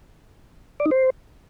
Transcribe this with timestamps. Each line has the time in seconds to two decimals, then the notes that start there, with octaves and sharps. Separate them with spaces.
0.80 D5
0.86 D#4
0.91 C5